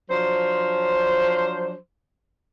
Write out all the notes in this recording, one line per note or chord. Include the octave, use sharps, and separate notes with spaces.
F3 F#3 D4 C5